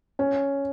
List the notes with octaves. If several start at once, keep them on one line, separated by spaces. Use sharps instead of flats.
C#4